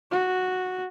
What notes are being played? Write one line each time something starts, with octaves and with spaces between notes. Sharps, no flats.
F#4